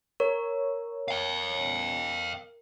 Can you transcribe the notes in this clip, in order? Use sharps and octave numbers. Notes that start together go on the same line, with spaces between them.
A#4 C#5
F5 G5